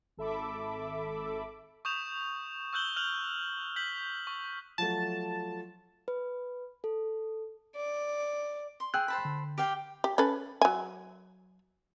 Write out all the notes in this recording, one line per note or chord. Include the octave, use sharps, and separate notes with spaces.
G#1 A4 E5 B5 D6
C#6 D#6 G6 E7 F7
C#6 E6 F#6 G6 F#7 G7
F6 F#6 F7 F#7
G6 B6 F#7
C#6
F3 F#3 A3 A5
B4
A4
D5
C6
G#4 G5 E6 F#6
C5 A5 B5
D3
G4 F5 G5
G4
C#4 A4 B4
F#3 G#5